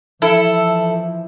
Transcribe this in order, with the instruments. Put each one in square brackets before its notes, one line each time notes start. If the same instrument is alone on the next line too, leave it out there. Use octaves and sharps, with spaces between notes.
[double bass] E3 F3 [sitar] E4 [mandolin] A4